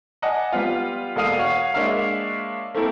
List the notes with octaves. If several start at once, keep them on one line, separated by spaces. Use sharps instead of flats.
D5 D#5 F#5 G#5 A5
G3 B3 F4
E1 A#3 A4 F5 D#6 D#7
F#4 C#5 F5 F#5
G#3 A#3 D4 C#5 E5 F5
A3 A#3 C4 E4 A4 A#4